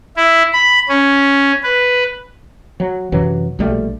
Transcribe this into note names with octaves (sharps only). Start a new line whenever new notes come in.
E4
B5
C#4
B4
F#3
F#2 C3 E3 F#3
A#1 B2 G3 A3